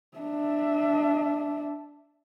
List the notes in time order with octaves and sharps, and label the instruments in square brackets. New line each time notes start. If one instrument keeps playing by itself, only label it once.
[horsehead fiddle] D4 E5